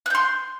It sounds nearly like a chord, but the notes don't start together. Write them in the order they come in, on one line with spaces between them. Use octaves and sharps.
F#6 G6 C6